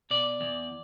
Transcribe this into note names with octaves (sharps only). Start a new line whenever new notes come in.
B2 D5
E2